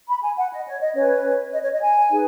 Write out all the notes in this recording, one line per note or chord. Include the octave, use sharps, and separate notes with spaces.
B5
G#5
F#5
D#5
C#5
D#5
C#4 B4 C#5
D#5
C#5
D#5
G#5
D#4 G#4 B4